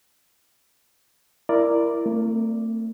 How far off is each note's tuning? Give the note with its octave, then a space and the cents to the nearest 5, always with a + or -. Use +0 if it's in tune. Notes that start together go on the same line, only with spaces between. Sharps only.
E4 +25 A#4 +0 D5 +0
A3 +40 C4 +0